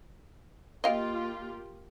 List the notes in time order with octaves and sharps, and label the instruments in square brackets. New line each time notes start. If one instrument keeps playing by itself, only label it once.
[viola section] A#3 F4 G4 [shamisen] D#5 F5 G5